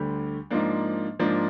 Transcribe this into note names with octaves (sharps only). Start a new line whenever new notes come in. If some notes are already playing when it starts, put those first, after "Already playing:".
Already playing: D2 D3 G3
G#2 F3 A#3 D4
G#2 F3 A#3 D4